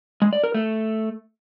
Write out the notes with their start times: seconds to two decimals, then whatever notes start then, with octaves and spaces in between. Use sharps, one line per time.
0.22 G#3
0.33 D5
0.44 A#4
0.54 A3